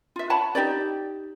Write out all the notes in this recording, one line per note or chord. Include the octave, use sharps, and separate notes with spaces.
F4 E5
C#5 F#5 A5 B5
D#4 G4 C#5 D5